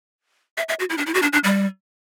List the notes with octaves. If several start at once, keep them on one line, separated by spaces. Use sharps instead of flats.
E5
E5
F#4
E4
D4
E4
F#4
D4
D4
G3